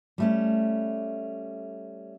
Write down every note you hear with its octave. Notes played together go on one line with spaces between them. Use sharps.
G3 A3 C#4